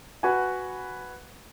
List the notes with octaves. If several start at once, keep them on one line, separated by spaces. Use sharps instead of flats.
F#4 B4 F#5 G#5